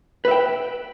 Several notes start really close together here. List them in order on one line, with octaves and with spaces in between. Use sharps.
B4 E5 G5